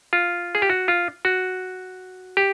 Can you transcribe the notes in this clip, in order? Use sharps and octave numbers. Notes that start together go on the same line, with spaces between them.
F4
G#4
G4
F#4
F4
F#4
G4